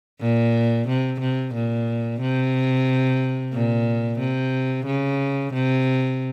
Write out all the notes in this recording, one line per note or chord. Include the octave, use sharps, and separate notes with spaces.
A#2
C3
C3
A#2
C3
A#2
C3
C#3
C3